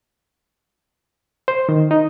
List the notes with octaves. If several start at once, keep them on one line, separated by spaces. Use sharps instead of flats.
C5
D#3
D#4